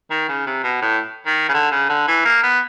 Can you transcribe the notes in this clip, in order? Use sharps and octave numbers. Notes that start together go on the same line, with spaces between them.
D#3
C#3
C3
B2
A2
D#3
C#3
D3
C#3
D3
E3
A#3
B3